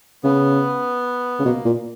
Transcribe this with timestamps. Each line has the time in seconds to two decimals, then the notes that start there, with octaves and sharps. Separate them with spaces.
0.23 C#3 B3
1.40 C#3
1.45 B2 A#3
1.65 A#2